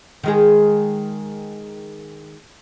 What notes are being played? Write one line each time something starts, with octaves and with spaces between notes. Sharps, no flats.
D#3 G#3 G#4